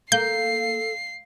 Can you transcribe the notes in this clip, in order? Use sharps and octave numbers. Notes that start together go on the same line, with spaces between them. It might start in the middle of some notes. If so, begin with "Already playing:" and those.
A#3 A4 G6 C7